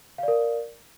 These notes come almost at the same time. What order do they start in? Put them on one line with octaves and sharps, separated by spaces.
F5 D5 A#4